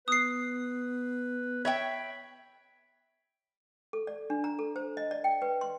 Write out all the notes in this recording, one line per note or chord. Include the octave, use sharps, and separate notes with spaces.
B3 B4 D#6 C7
C#5 E5 G5 B5
A4
D5
D4
A#5
A4
C5
D#5
D5
G5
B4
C6